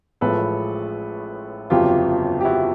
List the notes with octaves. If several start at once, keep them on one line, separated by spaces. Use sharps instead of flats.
A1 A2 F3 G#3 A4 B4
G1 F2 C#3 F#3 F4 G4
G4
E4 F#4